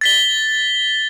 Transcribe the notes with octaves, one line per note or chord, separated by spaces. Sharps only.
A6 B6 G7